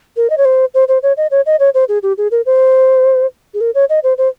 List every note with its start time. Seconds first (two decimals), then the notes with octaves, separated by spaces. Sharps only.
0.17 A#4
0.30 D#5
0.38 C#5
0.45 C5
0.74 C5
0.88 C5
1.03 C#5
1.17 D#5
1.31 C#5
1.46 D#5
1.60 C#5
1.74 C5
1.89 G#4
2.03 G4
2.18 G#4
2.31 A#4
2.46 C5
3.54 G#4
3.61 A#4
3.75 C#5
3.89 D#5
4.04 C5
4.18 C5